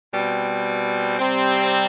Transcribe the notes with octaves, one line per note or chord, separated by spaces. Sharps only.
B2 G3 C4
C3 G3 C4